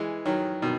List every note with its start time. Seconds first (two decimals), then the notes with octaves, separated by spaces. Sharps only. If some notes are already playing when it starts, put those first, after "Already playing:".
Already playing: E3 G#3
0.25 D#3 F#3
0.62 B2 D#3